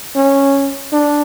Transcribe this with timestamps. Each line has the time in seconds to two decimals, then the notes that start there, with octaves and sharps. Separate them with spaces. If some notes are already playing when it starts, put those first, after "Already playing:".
0.16 C#4
0.93 D4